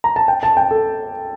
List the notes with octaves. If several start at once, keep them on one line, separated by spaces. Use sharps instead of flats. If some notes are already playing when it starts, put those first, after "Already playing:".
A#5
A5
G5
A5
G5
A4